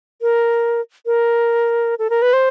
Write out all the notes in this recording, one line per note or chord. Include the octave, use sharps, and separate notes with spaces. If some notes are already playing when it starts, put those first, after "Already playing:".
A#4
A#4
A4
A#4
B4
C5